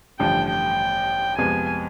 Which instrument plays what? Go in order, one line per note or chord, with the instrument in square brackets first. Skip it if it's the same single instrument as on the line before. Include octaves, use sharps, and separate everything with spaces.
[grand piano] A1 G2 D3 F3 [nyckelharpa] G5
[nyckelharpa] G5
[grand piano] F2 C3 F3 G#3 B3 [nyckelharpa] G#5